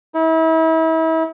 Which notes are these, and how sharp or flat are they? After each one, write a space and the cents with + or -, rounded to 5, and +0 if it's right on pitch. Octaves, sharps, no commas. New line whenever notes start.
E4 -35